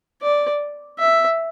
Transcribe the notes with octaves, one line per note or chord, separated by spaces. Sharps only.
D5
E5